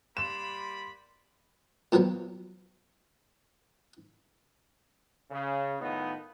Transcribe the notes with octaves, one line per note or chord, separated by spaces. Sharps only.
G3 A#3 B5 C6 E7
A#2 F3 F#3 A#3 B3
C#3
A2 D#3 B3 D#4 F4